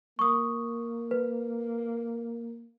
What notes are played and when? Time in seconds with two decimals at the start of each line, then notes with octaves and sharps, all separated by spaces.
0.19 A#3 C#6 D#6
1.11 B4